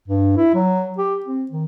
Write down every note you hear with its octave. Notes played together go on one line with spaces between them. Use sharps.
G2
E4
F#3
G4
C4
D#3